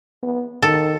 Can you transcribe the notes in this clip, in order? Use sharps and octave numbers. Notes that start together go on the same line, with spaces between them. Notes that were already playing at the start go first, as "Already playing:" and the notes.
B3
D#3 A4